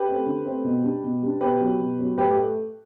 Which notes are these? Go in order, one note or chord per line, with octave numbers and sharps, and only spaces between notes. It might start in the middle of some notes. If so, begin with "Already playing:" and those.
Already playing: G4 B4
A3 C4
D3
A3 C4
B2
G3 D4
B2
G3 D4
B2 G4 B4
F#3 B3
B2
F#3 B3
A2 G4 B4
G4
A3